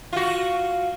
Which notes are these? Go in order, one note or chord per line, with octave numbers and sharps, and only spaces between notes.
F4 F#4